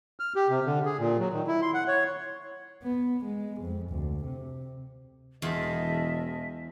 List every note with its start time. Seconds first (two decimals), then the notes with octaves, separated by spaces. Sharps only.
0.20 F6
0.36 G4
0.49 C3
0.66 D3
0.85 G#4
0.99 A#2
1.19 F#3
1.33 D#3
1.47 E4
1.62 C6
1.74 F#5
1.88 C#5
2.83 B3
3.25 G#3
3.61 F2
3.90 D2
4.25 C3
5.42 E1 E2 F4 D#5 E5 A5